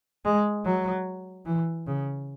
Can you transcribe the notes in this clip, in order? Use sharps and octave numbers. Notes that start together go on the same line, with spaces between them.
G#3
F#3
E3
C#3